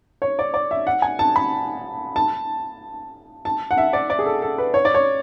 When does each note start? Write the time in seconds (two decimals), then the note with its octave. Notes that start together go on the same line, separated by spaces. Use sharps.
0.22 C#5
0.39 D5
0.54 D5
0.71 E5
0.87 F#5
1.02 G#5
1.19 A5
1.36 B5
2.16 A5
3.45 A5
3.71 F#5
3.78 E5
3.93 D5
4.10 D5
4.19 G#4
4.26 A4
4.42 A4
4.58 B4
4.74 C#5
4.85 D5
4.94 C#5